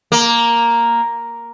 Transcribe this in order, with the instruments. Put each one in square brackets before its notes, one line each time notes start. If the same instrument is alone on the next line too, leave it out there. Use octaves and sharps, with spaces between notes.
[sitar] A#3